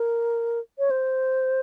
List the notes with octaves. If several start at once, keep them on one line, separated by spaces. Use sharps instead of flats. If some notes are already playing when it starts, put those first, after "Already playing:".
Already playing: A#4
C#5
C5